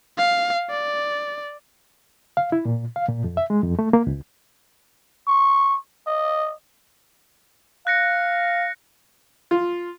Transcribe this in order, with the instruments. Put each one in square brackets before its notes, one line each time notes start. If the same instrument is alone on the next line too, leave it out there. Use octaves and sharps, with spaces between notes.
[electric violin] F5
D5
[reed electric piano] F5
E4
A#2
F5
A#2
F2
E5
G#3
F2
A3
A#3
C#2
[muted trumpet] C#6
D#5
[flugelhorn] F5 [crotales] F#6 A#6 C#7
[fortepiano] F4